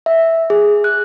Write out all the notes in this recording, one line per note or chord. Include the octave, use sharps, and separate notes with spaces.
E5
G#4
F#6